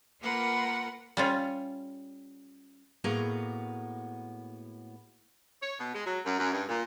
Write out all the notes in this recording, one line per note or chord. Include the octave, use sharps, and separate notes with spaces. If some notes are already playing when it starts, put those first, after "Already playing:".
A#3 F4 A#4 B4 F#5
G3 C#4 F4
A2 A#3 B3 F#4 G#4 A#5
C#5
B2
G#3
F#3
F#2
F#2
G2
A#2